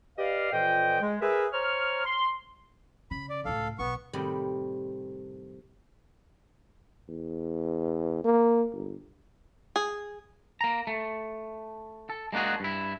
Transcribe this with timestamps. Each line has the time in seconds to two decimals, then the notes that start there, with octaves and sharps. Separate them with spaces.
0.18 G4 B4 D5 D#5 F5
0.52 F2 A#2 E3 D#5 G5
1.01 G#3
1.21 G#4 A#4 B4 E5
1.52 C5 C#5 A#5 C#6 F6
2.05 C6
3.11 C#3 B5
3.29 D5
3.45 C#2 A2 A4 F5
3.79 B1 B3 C#6
4.13 A2 C3 D#3 G3
7.09 E2
8.24 A#3
8.73 G1
9.76 G#4
10.61 A#3 A#5
10.87 A3
12.10 A4
12.33 G#3 A#3 D4 F#4 G#4
12.60 G2 E4